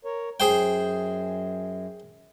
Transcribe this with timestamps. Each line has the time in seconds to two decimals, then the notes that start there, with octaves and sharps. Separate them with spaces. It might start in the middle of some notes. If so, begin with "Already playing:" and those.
0.05 A#4 C#5
0.40 F#2 G#4 C5 G5